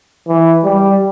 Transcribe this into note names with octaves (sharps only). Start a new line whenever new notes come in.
E3
G3